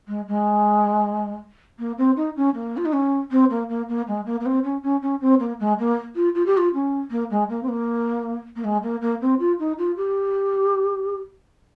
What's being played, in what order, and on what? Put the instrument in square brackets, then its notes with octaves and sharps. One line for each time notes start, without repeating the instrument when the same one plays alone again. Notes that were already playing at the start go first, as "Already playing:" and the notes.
[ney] G#3
G#3
A#3
C4
D#4
C#4
A#3
F4
D#4
C#4
C4
A#3
A#3
A#3
G#3
A#3
A#3
C4
C#4
C#4
C#4
C4
A#3
G#3
A#3
F4
F4
G4
F4
C#4
A#3
G#3
A#3
C4
A#3
A#3
G#3
A#3
A#3
C4
F4
D#4
F4
G4